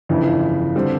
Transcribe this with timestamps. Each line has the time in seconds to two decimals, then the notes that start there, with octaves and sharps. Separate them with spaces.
0.09 G1 F2 C#3 E3
0.76 D3 G3 C4